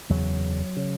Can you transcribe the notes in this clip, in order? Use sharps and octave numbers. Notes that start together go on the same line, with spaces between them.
F#1 E2 C#3 F#3
C#3